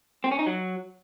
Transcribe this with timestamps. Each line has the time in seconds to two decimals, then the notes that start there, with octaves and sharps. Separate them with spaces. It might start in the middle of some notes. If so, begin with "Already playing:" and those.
0.24 C4
0.31 C#4
0.39 D#4
0.46 F#3